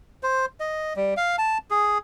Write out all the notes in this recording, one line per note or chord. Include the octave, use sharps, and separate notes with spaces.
C5
D#5
G3
F5
A5
G#4